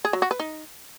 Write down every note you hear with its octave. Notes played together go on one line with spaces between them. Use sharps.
G#4
F#3
F#4
B4
D#4